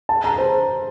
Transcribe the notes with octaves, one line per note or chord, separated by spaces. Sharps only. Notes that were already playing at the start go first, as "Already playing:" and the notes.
A5
A#5
C5